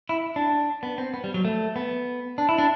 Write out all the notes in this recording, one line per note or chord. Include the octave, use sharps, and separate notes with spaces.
E4
D4
B3
C4
B3
G3
F#3
A3
B3
D4
E4
D4